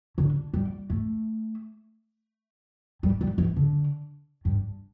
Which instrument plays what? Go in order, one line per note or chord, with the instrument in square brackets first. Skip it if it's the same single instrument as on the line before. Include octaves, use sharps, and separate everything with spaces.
[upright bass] D3
G3
A3
G3
G3
E3
D3
G2